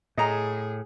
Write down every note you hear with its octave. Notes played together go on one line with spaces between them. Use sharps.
A2 G#4 D#5 A#5